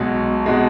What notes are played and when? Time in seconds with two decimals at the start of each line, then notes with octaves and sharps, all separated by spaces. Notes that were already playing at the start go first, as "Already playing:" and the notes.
Already playing: B1 B2 G#3
0.46 B2 G#3